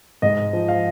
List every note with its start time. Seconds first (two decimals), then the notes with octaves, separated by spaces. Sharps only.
0.22 G#2 D#5
0.53 F3
0.68 F5